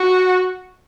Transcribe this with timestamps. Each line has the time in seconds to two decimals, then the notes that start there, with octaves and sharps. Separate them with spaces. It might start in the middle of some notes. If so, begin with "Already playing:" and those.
Already playing: F#4